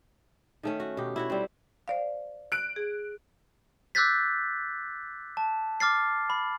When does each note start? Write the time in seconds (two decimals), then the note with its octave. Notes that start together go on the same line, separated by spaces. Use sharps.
0.63 D#3 A3 C#4
0.80 F#4
0.97 B2 G4
1.16 E4 F#4 C#5
1.30 G3 C4
1.88 C5 D5 F5
2.52 F#6 D7
2.76 G#4
3.95 D6 E6 F#6 G6 A6 B6
5.37 A5
5.80 D6 F6 A6 C7
6.30 B5